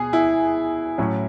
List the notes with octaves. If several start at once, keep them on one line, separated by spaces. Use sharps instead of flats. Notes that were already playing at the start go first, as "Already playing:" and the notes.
Already playing: B2 B3 G#4
E4
A2 F#3 C#4